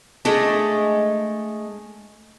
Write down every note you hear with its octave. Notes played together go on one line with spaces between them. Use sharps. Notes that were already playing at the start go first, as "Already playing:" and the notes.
G#3 A3 D4